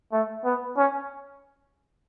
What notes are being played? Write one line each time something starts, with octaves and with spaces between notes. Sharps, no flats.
A3
B3
C#4